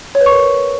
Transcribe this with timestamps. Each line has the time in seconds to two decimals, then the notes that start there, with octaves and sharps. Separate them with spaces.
0.15 C#5
0.21 B4
0.26 C#6
0.32 A#4